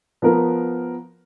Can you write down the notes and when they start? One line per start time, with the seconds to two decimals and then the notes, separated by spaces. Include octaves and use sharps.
0.22 F3 B3 A#4